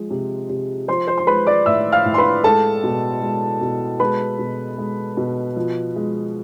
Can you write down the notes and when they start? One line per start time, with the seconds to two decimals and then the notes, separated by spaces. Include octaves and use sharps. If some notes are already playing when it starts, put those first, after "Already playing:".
Already playing: F3 G#3
0.10 C3
0.49 C3
0.88 F3 C5 C6
1.07 C5 C6
1.18 C6
1.27 G#3 B4 B5
1.47 D5 D6
1.66 A2 E5 E6
1.92 F5 F6
2.05 A2
2.14 C6
2.18 B4 B5
2.44 G#3 A4 A5
2.83 B2
3.22 G#3
3.61 B2
4.00 G#3 B4 B5
4.39 B2
4.78 G#3
5.17 B2
5.56 F3
5.96 G#3